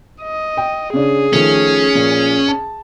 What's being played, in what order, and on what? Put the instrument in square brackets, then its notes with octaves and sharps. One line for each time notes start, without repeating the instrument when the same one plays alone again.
[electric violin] D#5
[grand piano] G5
[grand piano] C#3 C#4 D4 [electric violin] G#4
[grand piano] D#3 F3 A3 [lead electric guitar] C#4
[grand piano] A#2 F3
A5